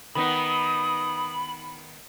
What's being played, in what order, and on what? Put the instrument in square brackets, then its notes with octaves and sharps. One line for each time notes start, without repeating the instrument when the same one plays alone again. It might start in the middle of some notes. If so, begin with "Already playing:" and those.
[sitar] D#3 B3 D#4 [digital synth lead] B5 [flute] D#6